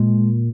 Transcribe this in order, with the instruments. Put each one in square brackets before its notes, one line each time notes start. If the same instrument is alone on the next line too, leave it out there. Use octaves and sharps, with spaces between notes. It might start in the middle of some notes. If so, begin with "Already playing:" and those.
Already playing: [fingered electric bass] A#2 [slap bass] G#3